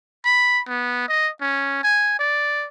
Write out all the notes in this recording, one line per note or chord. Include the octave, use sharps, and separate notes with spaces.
B5
B3
D#5
C#4
G#5
D5